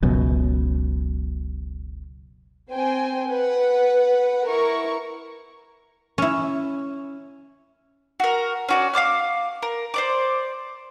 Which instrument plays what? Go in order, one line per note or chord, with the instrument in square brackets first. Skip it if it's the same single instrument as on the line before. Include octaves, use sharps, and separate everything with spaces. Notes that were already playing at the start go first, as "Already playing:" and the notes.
[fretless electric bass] F#1 C#2 F#2 B2
[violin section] C4 C5 G5 G#5
B4 F#5
E4 A#4 C#6
[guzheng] C#4 E4
[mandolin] F#4 A#4
C#4 F#4 D5
F5 A5 D6 F6
A#4
C5 D5 D6